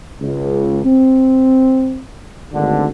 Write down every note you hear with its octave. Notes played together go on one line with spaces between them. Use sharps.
C#2
C4
G#1 D2 D3